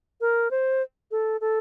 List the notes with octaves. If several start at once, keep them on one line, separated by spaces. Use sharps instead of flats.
A#4
C5
A4
A4